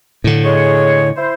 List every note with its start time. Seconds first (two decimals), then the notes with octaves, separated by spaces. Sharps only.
0.24 A2 D3
0.43 G#3 G#4 C#5
1.15 E4 C5